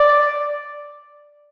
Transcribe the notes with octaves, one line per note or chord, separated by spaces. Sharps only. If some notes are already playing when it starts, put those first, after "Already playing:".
Already playing: D5